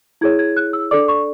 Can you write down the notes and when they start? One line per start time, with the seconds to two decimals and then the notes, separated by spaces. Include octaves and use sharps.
0.21 E4 G#4 C#5 G#6
0.39 G#6
0.57 F#6
0.73 E6
0.91 D4 A4 D5 D6
1.08 C#6